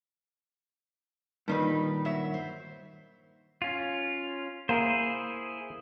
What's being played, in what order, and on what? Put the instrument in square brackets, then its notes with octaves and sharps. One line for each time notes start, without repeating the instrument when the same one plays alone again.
[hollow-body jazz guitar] G2 A#2 D#3 [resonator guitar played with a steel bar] G3 D#4 B4
[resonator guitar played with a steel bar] F#3 E5
C5
[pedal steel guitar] C#4 F4
[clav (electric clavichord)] A#3 [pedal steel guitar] E4 G#4 C5